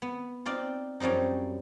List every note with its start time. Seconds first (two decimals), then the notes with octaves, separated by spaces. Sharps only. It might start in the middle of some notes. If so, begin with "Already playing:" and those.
0.02 B3
0.46 C4 D#4 F4 D5
1.00 F#2 F3 G3 C4 D#4